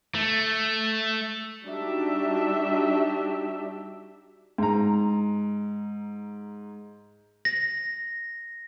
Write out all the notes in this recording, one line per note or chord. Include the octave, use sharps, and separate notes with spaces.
A3
G3 D4 D#4 F#4 G4 E5
G#2 A#5
A#6